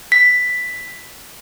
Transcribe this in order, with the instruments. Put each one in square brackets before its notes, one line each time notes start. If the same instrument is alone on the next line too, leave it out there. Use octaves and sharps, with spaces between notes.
[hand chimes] B6